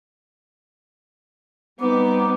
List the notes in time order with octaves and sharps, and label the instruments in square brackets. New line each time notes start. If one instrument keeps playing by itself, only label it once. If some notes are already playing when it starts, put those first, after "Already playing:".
[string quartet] G3 B3 D#4 [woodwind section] C4 D6